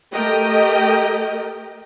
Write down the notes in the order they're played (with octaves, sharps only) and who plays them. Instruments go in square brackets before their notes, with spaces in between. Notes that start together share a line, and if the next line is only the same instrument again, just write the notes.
[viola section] A3 G4 A#4 D#5 G5